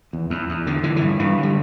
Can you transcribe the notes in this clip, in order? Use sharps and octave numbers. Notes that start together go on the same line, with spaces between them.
E2
E2
E2
D3
D3 E3
G2 E3
G2 E3
D3
G3